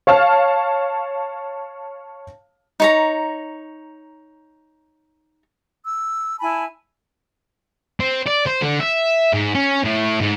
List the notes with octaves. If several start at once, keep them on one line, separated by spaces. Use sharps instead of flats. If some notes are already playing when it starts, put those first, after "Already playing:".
C#5 F5 A5 F6
D#4 C#5 A#5
E6
E4 G#5 A5 B5
C4
D5
C5
D3
E5
G#2
C#4
A2
G#2